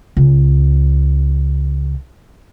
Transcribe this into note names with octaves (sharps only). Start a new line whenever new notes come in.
C#2 C#3